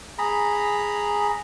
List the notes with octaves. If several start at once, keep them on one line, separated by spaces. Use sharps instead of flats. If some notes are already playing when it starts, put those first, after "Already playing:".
G#4 A#5 B5